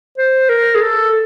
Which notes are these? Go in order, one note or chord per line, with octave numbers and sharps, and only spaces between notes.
C5
A#4
G#4
A4